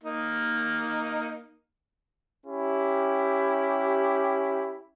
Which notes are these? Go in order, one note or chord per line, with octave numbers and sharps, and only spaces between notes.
A#3 D#4
C#4 E4 G4